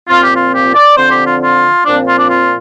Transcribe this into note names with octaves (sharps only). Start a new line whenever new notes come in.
A#2 F3 C4 F4
G4
F4
G4
D5
D3 F3 C4 C5
G4
F4
F4
A#2 F3 C4 D4
F4
D4
F4